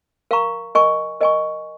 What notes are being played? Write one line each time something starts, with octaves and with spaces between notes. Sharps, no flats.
A#4 F5 A#5 C#6
A#4 D#5 G#5 C#6
A#4 D#5 G#5 C#6